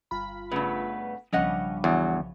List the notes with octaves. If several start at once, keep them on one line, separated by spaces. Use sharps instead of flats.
G1 F4 B5
G2 C#3 A3 B3 B4
B1 G2 C#3 F3 C#4 D#5 F#5
E2 F#3